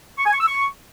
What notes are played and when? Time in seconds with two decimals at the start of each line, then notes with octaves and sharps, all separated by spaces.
0.18 C#6
0.26 G#5
0.33 C#6
0.41 E6
0.48 C#6